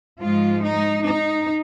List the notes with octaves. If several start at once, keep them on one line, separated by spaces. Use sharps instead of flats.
G#2 F3 G#3 F4
D#4
D#4